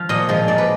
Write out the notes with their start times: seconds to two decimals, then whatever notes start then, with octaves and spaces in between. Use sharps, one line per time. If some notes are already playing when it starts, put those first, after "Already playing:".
Already playing: F3 F5
0.09 A#2 D#5
0.29 F3 G#3
0.48 A#2 D5
0.58 B4